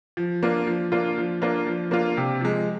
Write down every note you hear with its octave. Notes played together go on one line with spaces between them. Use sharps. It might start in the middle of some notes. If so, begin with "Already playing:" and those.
F3
A#3 D4 F4
F3
A#3 D4 F4
F3
A#3 D4 F4
F3
A#3 D4 F4
C3
F3 G#3